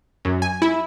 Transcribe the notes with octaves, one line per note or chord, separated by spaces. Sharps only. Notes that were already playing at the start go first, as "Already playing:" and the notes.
F#2
G#5
E4